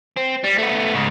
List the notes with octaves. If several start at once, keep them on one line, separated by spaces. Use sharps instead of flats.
C4
G3
A3 B3
G#2 C#3